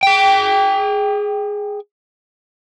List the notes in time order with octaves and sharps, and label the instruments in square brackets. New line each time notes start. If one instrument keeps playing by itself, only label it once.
[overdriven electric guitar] G#4 G5